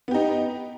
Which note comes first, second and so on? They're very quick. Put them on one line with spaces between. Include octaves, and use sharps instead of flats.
B3 G4 D#4